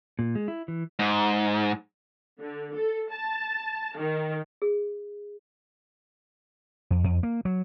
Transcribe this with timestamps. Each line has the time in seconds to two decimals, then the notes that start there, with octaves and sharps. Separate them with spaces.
0.19 A#2
0.35 G#3
0.48 E4
0.68 E3
0.99 G#2
2.40 D3
2.75 A4
3.11 A5
3.96 D#3
4.62 G#4
6.90 F2
7.04 F2
7.23 A#3
7.45 F#3